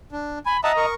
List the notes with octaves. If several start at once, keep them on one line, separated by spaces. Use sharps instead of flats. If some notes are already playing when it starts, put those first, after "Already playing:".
D4
G#5 B5
D#5 E5 F#5 A5 A#5 D#6
A#4 C#6